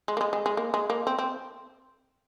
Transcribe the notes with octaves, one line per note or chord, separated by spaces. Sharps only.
G#3
A#3
G#3
G#3
G#3
A#3
G#3
A#3
C4
C4